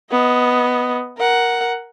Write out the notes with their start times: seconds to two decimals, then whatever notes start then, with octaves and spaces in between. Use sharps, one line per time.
0.11 B3 D#5
1.18 A#4 F#5